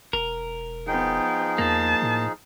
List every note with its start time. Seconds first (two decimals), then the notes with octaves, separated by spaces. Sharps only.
0.13 E1 A#4
0.87 F3 B3 D#4 G#4 G5
1.58 E2 A#3 A5
2.02 A2